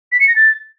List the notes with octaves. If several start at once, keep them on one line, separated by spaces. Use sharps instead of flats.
B6
C#7
A#6
A6